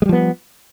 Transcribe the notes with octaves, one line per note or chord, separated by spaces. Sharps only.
F3 G3 G#3 B3